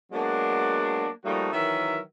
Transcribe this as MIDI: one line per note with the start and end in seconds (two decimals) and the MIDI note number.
0.12 1.07 54
0.12 1.07 56
0.12 1.07 58
0.12 1.07 59
0.12 1.07 62
1.23 1.51 53
1.23 1.51 55
1.23 1.51 57
1.23 1.51 58
1.23 1.51 63
1.23 1.51 66
1.52 1.99 51
1.52 1.99 52
1.52 1.99 54
1.52 1.99 70
1.52 1.99 76